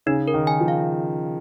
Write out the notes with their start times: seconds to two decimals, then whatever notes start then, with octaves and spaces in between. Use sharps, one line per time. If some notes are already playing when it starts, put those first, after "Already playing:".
0.06 C#3 D#4
0.28 A#4
0.34 D#3
0.47 G#5
0.61 F3
0.68 F5